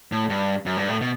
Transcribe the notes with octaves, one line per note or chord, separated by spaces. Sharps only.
A2
G2
F#2
G2
A2
B2